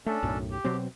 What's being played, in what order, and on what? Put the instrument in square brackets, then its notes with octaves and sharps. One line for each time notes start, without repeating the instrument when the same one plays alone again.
[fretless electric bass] A3 [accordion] C#4 D4 A4
[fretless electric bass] B1 F#2 A2
[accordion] G4
[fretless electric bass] B2 F#3 C4